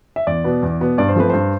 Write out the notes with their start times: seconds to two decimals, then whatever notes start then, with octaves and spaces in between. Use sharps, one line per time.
0.16 E5
0.27 E2 D5
0.44 B2 B3
0.62 E2
0.80 B2 B3
0.98 G2 D5
1.08 C5
1.16 F3 A3 C4 B4
1.30 G2 C5